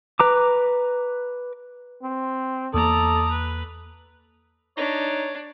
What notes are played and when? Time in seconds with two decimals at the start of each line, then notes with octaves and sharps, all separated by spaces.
0.19 B4 A#5 D6
2.03 C4
2.74 E2 A#3 A4 D5 A#5 D#6
3.31 B4
4.77 D4 D#4 C#5